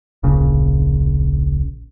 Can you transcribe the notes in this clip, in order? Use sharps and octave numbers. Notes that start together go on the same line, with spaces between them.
D1 A#1 C#3